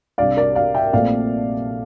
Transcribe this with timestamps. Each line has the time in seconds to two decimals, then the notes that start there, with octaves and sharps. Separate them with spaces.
0.18 C2 C3 G3 D4 D5 F5
0.37 A#4 D5
0.55 D5 F5
0.74 E5 G5
0.93 A#1 A#2 A3 C4 D5 F5